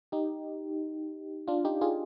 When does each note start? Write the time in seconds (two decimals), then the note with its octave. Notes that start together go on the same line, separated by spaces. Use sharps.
0.12 D#4 G4
1.48 D4 F4
1.65 D#4 G4
1.81 F4 G#4